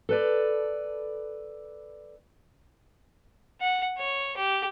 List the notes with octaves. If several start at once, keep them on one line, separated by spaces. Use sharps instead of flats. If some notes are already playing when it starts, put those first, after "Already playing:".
A4 B4 D5
F#5
C#5
G4